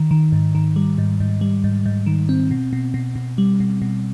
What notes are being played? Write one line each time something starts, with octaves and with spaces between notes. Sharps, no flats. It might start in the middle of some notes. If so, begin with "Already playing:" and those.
Already playing: D#3
D#3
G#2
D#3
G3
G#2
G#2
G3
G#2
G#2
D#3
C4
B2
B2
B2
B2
G3
B2
B2